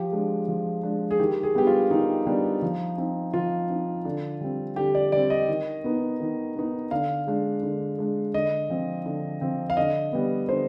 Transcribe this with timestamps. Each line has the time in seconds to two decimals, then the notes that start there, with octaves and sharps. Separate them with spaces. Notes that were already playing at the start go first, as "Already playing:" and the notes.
Already playing: F3 G4
0.12 G#3 D4
0.48 F3
0.83 G#3 D4
1.11 G#4
1.19 D#3 G4
1.43 G#4
1.55 G3 B3 D4 G4
1.67 F4
1.91 D#3 D#4
2.27 G3 B3 D4
2.62 F3
2.98 C4 D#4
3.34 F3 F4
3.69 C4 D#4
4.05 D3
4.41 G3 C4
4.76 D3 G4
4.95 D5
5.12 G3 C4 D5
5.30 D#5
5.48 D#3
5.84 B3 D#4
6.20 D#3
6.56 B3 D#4
6.91 D3 F5
7.27 G#3 D4
7.63 D3
7.98 G#3 D4
8.34 D3 D#5
8.70 F3 C4
9.06 D3
9.41 F3 C4
9.70 F5
9.77 D3 D#5
10.13 G3 B3
10.49 D3 C5